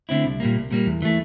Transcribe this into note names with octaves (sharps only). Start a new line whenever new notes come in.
D3 A3 C4 E4
C2
A#2 G3 A#3
C2
A#2 G3 A#3
E2
E3 A3